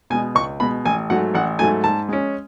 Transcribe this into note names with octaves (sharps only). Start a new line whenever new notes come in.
B2 G#3 G#5
C#2 C#6
B2 G#3 B5
A1 G#5
G#2 F#3 A3 F#5
A1 F#5
G#2 F#3 A3 G#5
G#2 A5
G#3 C#4